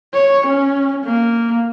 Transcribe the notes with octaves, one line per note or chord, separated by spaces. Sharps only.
C#5
C#4
A#3